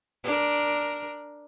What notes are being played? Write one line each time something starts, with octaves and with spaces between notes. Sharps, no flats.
D4 A#4